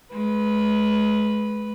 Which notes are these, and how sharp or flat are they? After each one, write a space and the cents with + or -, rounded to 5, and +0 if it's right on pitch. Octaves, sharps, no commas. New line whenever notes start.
G#3 +35 B4 +0